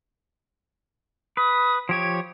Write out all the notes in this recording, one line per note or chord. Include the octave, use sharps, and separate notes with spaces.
B4 D#6
F3 G4 C#5 G#6